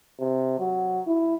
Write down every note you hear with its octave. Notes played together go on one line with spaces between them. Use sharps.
C3
F#3
E4